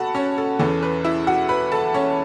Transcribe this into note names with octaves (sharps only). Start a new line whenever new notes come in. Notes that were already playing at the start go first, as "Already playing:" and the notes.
Already playing: B2 F#4 A4 F#5 A5 B5
C#4 C#5
A4
E2 E3 C#4 A4
B4
E4 E5
F#4 F#5
B4 B5
A4 A5
C#4 C#5